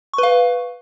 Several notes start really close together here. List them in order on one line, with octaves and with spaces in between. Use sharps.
C#6 B4 F5